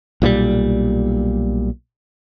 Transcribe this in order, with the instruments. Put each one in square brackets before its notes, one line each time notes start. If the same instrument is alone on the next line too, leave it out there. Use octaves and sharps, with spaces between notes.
[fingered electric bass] B1 A#2 D#3 G3